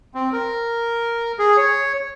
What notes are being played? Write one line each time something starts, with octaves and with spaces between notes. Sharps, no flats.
C4
A#4
G#4
C#5